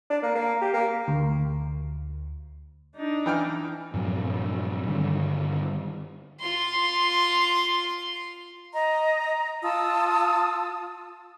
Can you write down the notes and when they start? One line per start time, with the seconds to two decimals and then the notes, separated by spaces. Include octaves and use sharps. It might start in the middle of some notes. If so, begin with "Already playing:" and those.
0.10 D4
0.23 A#3
0.35 A#3
0.62 G4
0.74 A#3
1.08 D2
2.96 D4 D#4
3.26 E3 G5 F6
3.94 G2 A#2 F3 F#3
4.86 G2 D3 D#3
6.40 F4 C6
8.73 D#5 A#5
9.62 F4 A5 D#6 E6